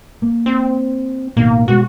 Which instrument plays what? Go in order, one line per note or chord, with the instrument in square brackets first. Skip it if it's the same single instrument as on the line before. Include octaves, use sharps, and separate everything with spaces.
[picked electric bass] A#3
[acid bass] C4
[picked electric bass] A1 B2 D#3 [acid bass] A#3
[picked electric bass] B2 G#3 [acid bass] F#4